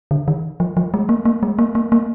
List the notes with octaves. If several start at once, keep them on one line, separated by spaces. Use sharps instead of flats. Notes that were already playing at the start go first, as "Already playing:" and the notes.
D3
D#3
F3
F3
G#3
A#3
A#3
G#3
A#3
A#3
A#3